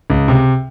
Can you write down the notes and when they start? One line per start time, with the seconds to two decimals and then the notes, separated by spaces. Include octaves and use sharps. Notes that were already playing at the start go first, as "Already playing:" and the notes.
0.10 C#2
0.28 C3